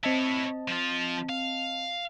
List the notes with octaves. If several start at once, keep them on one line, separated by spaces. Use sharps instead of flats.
C4 E4 C#5 D#5 A5
F3 F4
F5